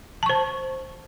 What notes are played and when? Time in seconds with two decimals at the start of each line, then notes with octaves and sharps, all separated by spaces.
0.23 A5
0.26 C#6
0.29 C5